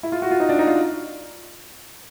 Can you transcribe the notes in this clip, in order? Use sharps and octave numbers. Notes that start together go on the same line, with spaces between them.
E4
F4
F#4
F4
D#4
D4
D#4
F4